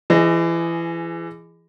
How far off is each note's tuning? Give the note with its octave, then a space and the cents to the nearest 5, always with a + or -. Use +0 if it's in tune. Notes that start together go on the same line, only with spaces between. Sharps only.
E3 +30 G#4 +0 D#5 +0